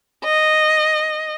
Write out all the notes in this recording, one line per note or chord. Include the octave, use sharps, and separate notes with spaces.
D#5